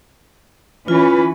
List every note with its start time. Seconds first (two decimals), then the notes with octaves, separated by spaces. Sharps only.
0.88 E3 C#4 F4 B4